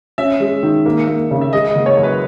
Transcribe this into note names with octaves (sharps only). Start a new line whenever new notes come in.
C#4 E5
G#3
D#3
A#3
A#3
C#3
E5
G#3 D#5
D#5
F#1
C#5
F#2
B4